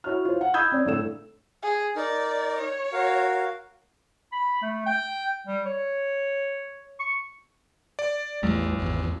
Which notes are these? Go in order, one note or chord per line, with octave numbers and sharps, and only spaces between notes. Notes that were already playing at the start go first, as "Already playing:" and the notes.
E4 F#4 C#5 F6
F4 C5
F#5
D#5 B5 D#6 E6 G6 G#6
C4 C#4 D5
G1 A2 A4 E6 E7
G#4
D#4 A#4 D5
C#5
F#4 A#4 F5
B5
A3
G5
G3
C#5
C#6
D5
A1 E2 G3 A3
G#1 E2